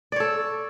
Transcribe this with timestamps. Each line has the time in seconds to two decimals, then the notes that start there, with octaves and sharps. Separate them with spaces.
0.12 D5
0.16 C#5
0.20 A4